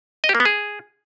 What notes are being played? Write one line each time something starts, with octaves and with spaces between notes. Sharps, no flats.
D#5
G4
A#3
B3
G#4